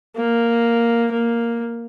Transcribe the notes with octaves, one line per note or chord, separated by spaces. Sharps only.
A#3
A#3